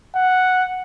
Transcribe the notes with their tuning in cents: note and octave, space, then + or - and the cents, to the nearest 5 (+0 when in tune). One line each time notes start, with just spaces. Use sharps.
F#5 -5